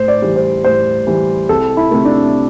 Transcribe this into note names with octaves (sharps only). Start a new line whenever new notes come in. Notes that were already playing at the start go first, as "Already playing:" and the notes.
Already playing: A2 C5
D5
E3 G3
C5
A2 C5
E3 G3
C2 A4
E4
C3 A3
D4